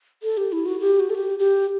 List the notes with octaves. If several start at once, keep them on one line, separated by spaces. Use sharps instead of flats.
A4
G4
E4
F#4
G4
F#4
A4
G4
G4